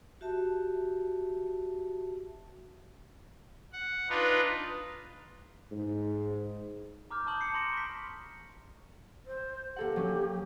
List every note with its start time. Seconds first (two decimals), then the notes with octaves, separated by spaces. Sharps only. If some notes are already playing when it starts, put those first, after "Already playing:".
0.21 F#4 G4 E5 A5
3.73 F#5
4.09 D4 D#4 F4 B4
5.72 G#2
7.11 A#5 D6 F6 G6
7.27 A5 C#6 D#6 G6 F#7
7.39 B5 G6 C7 C#7
7.54 A#5 C6 A#6 C#7 D7 E7
7.73 C#6 B6
9.26 C5
9.76 A#3 G4 A4 F#5
9.96 F#3 C#4